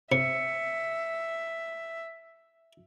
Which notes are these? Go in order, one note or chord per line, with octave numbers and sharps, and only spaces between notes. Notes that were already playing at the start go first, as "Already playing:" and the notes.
C3 E5 C#7